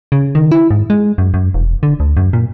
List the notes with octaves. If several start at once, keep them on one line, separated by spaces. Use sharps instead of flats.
C#3
D#3
E4
G#2
G#3
F#2
F#2
E1
D3
D2
F#2
A#2